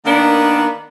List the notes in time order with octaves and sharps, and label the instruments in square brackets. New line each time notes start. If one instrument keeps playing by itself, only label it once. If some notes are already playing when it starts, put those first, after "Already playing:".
[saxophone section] D#3 B3 D4 [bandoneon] A#3